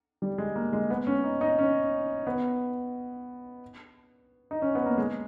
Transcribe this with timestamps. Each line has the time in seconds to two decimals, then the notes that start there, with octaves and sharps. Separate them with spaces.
0.22 G3
0.38 G#3
0.56 A#3
0.73 G#3
0.90 B3
1.07 C#4
1.24 D#4
1.41 D#4
1.59 C#4
2.27 B3
4.51 D#4
4.62 C#4
4.75 B3
4.86 A#3
4.98 G#3